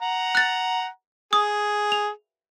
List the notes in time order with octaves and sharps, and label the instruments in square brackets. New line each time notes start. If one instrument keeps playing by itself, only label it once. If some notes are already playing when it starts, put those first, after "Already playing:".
[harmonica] F#5 A#5
[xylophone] F#6 A6
[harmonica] G#4 [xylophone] D#6
[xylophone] F7